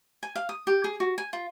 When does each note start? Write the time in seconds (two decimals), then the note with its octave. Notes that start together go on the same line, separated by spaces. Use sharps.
0.23 G#5
0.36 F5
0.49 D#6
0.67 G4
0.84 G#4
1.00 F#4
1.18 G#5
1.33 F4